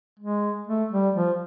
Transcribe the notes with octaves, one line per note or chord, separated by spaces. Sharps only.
G#3
A3
G3
F3